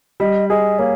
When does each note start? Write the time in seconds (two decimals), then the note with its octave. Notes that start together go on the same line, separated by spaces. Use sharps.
0.20 G3 D#5
0.50 G#4 D#5
0.79 A#3 C#5